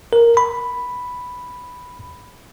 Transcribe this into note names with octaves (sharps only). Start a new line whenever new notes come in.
A#4
B5